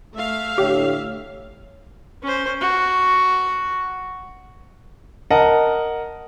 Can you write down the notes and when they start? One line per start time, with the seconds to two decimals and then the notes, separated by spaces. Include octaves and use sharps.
0.15 A3 E5 F5
0.58 A2 D3 G4 C#5
2.23 C#4 C5
2.61 F#4
5.30 A#4 D#5 F#5 A5